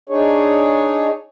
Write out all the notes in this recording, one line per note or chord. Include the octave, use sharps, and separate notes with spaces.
D4 D#4 G#4 C#5